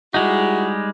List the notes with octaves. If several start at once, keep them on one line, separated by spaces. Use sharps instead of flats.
G3 G#3 D#4 E4 F#4 G#4